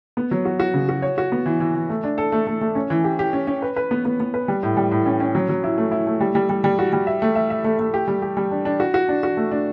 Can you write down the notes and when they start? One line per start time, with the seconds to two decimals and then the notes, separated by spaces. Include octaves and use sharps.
0.17 B3
0.31 F#3
0.45 F#4
0.60 F#4
0.74 C#3
0.89 F#4
1.02 C#5
1.18 F#4
1.32 B3
1.46 E3
1.60 E3
1.75 E3
1.89 A3
2.04 D4
2.18 A4
2.32 A3
2.47 A3
2.61 A3
2.75 C#4
2.90 E3
3.04 G4
3.19 G4
3.33 C#4
3.47 C#4
3.62 B4
3.76 B4
3.91 B3
4.05 B3
4.20 B3
4.34 B4
4.48 G3
4.63 A2
4.77 G3
4.91 A2
5.06 C#4
5.20 C#4
5.35 F#3
5.49 F#3
5.63 E4
5.78 A3
5.91 E4
6.07 A3
6.20 G3
6.35 G3
6.49 G3
6.64 G3
6.79 F#4
6.93 G3
7.07 E5
7.22 A3
7.35 E5
7.50 E5
7.65 A3
7.79 A3
7.94 G4
8.08 G3
8.22 G4
8.37 G3
8.51 D4
8.65 D4
8.80 F#4
8.94 F#4
9.09 D4
9.23 F#4
9.37 A3
9.51 D4